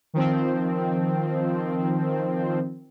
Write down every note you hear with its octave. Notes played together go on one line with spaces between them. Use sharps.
D#3 F3 C4